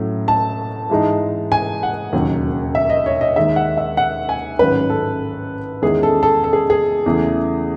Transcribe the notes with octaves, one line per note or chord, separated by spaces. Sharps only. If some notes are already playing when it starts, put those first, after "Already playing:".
Already playing: A2 F#3 C#4
A5
G#2 E3 G#3 D#4
G#5
F#5
E1 D#2 C#3 F#3
E5
D#5
C#5
D#5
D#2 D#3 G#3 D#4 E5
F#5
E5
F#5
G#5
A1 G#2 D#3 F#3 C#4 B4
A4
E2 D#3 G#3 C#4 E4 G#4
A4
A4
A4
G#4
G#4
E2 C#3 E3 A3